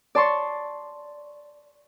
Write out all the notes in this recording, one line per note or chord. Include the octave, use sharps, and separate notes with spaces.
D5 A5 C6 C#6